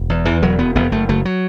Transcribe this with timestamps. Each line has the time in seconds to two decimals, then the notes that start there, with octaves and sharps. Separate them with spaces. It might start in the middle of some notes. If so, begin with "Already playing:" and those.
Already playing: E1
0.10 E2
0.25 E2 E3
0.42 E1 F#3
0.59 E1 B3
0.75 E1 B3
0.92 F#1 A3
1.09 F#1 A3
1.25 F#3